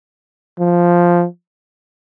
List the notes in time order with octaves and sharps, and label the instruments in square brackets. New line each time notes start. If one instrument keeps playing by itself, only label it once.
[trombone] F3